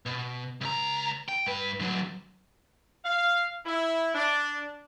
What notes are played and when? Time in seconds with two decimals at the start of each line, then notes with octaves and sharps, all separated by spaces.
0.06 B2
0.61 C#2 A#5
1.29 G5
1.47 G2 B4
1.80 D3 F#3
3.05 F5
3.66 E4
4.15 D4